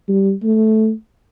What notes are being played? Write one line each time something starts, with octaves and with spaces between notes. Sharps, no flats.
G3
A3